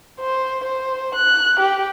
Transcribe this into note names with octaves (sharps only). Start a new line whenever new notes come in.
C5
C5
F#6
G4